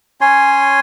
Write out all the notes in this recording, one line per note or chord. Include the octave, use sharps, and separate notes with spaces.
C#4 C#5 G#5 C6